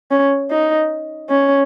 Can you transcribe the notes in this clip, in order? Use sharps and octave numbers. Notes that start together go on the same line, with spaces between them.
C#4
D#4
C#4